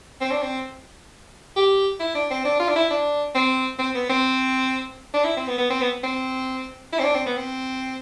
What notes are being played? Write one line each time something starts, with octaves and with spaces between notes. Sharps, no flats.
C4
D4
C4
G4
E4
D4
C4
D4
F4
D4
E4
D4
C4
C4
B3
C4
D4
E4
C4
B3
B3
C4
B3
C4
E4
C4
D4
C4
B3
C4